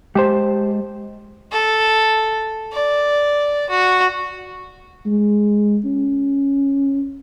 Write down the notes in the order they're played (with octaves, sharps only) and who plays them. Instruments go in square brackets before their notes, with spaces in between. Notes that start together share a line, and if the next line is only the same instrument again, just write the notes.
[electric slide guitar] G#3 A5 [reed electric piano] G4 C5
[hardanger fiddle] A4
D5
F#4
[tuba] G#3
C#4